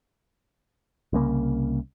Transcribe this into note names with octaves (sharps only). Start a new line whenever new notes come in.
C2 C#3 A#3